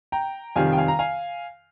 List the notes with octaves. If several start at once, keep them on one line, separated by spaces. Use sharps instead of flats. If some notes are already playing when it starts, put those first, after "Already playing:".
G5 A#5
F2 C3 D#3 G3 F5 G#5
G5
F5 G#5
A#5
F5 G#5